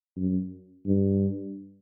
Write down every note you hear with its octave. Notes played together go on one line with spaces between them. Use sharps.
F#2
G2